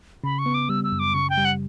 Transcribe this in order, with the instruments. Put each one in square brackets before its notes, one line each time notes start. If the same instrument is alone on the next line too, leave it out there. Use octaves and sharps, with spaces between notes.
[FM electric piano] C#3 [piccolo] B5
[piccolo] C#6
[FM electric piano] B3
[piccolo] D6
[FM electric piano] G3 [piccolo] E6
[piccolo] E6
[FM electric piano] F#2
[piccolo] D6
[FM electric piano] C#3 [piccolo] C#6
[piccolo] G5
[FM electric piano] G3
[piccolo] F#5